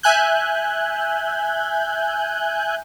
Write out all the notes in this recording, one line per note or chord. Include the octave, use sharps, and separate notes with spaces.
E5 G#5 F#6 G6